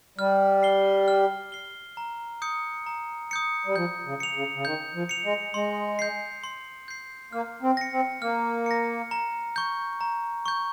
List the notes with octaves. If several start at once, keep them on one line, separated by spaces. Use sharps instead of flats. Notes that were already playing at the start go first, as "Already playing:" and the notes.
G3 F6
C7 G7
F6
C7 G7
A#5
D#6 G6 C#7
A#5
D#6 G6 C#7
G3
F3 G6
C#3
C#7 F7
C#3
C#3
D#3 G6
F3
C#7 F7
G#3
G#3 C6
G6 C7
C6
G6 C7
A#3 F6
C4
A#6 C#7
C4
A#3 F6
A#6 C#7
A#5
C#6 G6
A#5
C#6 G6